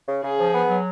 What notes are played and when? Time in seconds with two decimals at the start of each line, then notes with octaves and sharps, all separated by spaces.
0.08 C#3
0.24 C#3 G#4
0.39 F3
0.54 B3
0.70 F#3